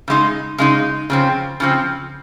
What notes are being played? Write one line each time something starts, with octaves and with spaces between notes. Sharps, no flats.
C#3 G#3 D#4
C#3 G#3 D#4
C#3 F3 C4
C#3 F3 C4